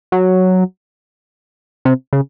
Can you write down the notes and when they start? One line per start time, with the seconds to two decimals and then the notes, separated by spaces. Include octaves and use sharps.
0.12 F#3
1.85 C3
2.13 C#3